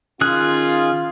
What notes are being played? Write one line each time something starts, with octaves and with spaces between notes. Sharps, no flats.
D#3 C#4 F4 G#4 F#6